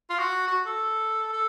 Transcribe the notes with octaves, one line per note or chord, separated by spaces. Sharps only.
F4
F#4
F#4
A4
A4